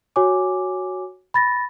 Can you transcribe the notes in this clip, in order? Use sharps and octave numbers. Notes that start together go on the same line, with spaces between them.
F#4 C#5 G#5 D6
B5 A6 A#6